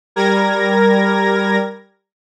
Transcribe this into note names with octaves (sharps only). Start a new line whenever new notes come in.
G3 A#4 G#6 A#6